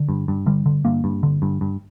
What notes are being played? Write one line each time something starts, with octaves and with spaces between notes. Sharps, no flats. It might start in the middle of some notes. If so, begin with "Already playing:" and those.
Already playing: D3
G2
G2
D3 G3
D3
G2 A#3
G2
D3
G2
G2